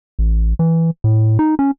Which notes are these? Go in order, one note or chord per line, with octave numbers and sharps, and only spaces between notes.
A1
E3
A2
D#4
C#4